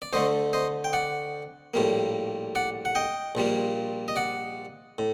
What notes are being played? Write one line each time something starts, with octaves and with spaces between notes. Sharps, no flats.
D5
D2 D3 A3 C5 D#5
C5 D#5
G5
D5 F#5
A#1 A2 G3 A#3
D5 F#5
F#5
D#5 G5
A#1 A#2 G3 A#3
D#5
D5 F#5
A2